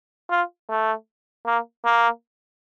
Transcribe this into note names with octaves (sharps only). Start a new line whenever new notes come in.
F4
A3
A#3
A#3